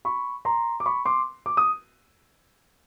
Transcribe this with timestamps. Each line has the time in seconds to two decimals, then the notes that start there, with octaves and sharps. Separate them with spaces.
0.05 B5 C#6
0.45 A#5 C6
0.80 D6
0.86 B5 C#6
1.05 C6 D6
1.46 D6
1.57 D#6